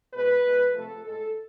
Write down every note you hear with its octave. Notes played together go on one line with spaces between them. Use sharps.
B2 G#3 B4
B2 G#3
C3 F3 A3 A4
A2 G#3 A4